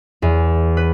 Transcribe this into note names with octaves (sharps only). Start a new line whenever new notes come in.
E2
B4